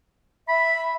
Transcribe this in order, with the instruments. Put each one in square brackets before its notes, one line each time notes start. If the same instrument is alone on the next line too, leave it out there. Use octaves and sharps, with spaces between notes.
[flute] E5 [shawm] B5